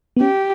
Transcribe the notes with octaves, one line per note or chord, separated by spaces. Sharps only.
B3
C#4 G4